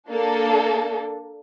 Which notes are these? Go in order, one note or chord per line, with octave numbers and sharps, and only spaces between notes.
A#3 D4 A4